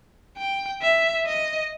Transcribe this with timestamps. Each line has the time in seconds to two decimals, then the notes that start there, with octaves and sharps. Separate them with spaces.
0.38 G5
0.82 E5
1.26 D#5